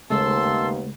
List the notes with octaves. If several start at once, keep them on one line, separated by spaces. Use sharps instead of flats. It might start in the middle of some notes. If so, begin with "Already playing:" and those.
D#2 C#3 G#3 A3 B3 A5 C6 E6